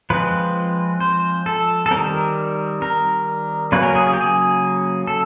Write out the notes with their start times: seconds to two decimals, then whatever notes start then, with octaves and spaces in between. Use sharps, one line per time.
0.10 F3 G#3 C4 B4
1.00 C5
1.46 A4
1.86 A4
1.91 D#3 G3 C4 A#4
2.82 A#4
3.72 C#3 F#3 A#3 C#4 B4
3.83 A#4
3.95 G#4
4.07 G#4
4.13 G4
4.21 G#4
5.07 A4